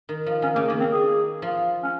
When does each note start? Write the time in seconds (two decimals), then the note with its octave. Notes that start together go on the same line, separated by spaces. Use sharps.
0.09 D#3
0.26 F3
0.42 D#3 C#4
0.55 C#3 A#3
0.67 D#3 A#3
0.80 C4
0.92 G#4
1.42 F3
1.83 C#4